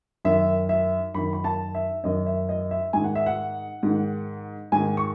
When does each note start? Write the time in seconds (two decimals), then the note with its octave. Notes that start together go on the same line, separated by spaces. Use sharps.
0.25 F#2 D#3 E5
0.69 E5
1.14 F#2 D#3 B5
1.33 B5
1.44 A5
1.74 E5
2.04 F#2 D#3 D#5
2.26 E5
2.49 D#5
2.71 E5
2.93 G#2 D#3 G#5
3.04 F#5
3.15 E5
3.26 F#5
3.83 G#2 D#3
4.72 G#2 D#3 G#5
4.97 C#6